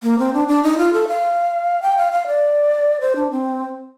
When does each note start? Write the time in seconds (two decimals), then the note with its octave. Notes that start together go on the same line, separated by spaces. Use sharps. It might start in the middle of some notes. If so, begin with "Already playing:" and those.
0.03 A#3
0.19 C4
0.34 D4
0.48 D4
0.63 D#4
0.78 F4
0.93 A4
1.08 F5
1.82 G5
1.98 F5
2.12 F5
2.27 D5
3.01 C5
3.16 D4
3.31 C4